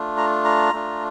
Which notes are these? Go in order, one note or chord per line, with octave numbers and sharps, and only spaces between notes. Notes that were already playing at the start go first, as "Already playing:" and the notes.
Already playing: A3 D4 F4
A#5
A#5
A3 D4 F4